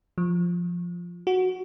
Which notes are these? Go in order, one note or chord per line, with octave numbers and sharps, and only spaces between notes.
F3
F#4